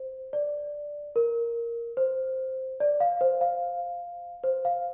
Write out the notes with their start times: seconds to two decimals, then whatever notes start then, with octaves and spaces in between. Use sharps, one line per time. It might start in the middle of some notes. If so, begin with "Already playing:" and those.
Already playing: C5
0.33 D5
1.16 A#4
1.97 C5
2.80 D5
3.00 F5
3.21 C5
3.41 F5
4.44 C5
4.65 F5